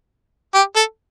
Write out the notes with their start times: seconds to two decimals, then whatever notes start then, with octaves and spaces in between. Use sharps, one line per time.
0.55 G4
0.76 A4